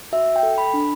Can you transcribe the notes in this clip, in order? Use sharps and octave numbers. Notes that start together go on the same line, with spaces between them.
F#4 E5
G5
A4
B5
D4